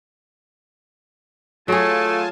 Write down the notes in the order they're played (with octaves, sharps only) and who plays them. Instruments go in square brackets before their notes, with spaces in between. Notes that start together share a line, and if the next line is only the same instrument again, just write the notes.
[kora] F#3 G#4 [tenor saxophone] A3 [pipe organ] F4 G#5 A5